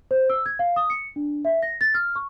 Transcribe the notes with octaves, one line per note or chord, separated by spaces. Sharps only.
C5
E6
G#6
F5
D#6
C#7
D4
E5
A#6
A6
F6
C#6